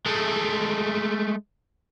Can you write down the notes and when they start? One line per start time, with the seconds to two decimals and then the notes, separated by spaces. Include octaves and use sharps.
0.06 G#3 A3